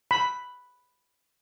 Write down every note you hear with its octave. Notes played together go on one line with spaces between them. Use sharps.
B5